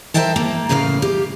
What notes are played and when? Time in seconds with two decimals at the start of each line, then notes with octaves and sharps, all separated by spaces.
0.14 A#4 C5 D5 E5 G5 A5
0.36 A#3
0.69 A2 C#3 A#3 C#5 F5
1.02 G4